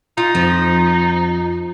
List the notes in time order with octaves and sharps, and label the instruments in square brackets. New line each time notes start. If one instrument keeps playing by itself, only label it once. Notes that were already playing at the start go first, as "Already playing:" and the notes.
[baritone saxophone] D#4 [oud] F4
[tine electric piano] F2 [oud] F3